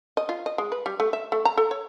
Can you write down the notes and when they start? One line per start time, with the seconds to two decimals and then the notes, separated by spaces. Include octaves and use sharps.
0.17 D#5
0.29 F4
0.46 D#5
0.58 G#3
0.72 B4
0.86 G3
1.00 A3
1.13 E5
1.32 A3
1.45 A#5
1.58 A4
1.71 C#5